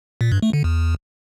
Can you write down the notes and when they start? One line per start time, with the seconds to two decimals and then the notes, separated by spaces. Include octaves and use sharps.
0.21 A#2
0.32 G2
0.42 A3
0.53 D3
0.64 E2